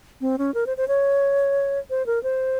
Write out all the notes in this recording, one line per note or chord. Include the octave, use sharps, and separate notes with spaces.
C4
C#4
A#4
C5
C5
C#5
C5
A#4
C5